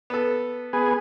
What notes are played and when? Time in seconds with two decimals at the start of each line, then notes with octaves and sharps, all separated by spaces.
0.10 B3 A4
0.73 B3 G#4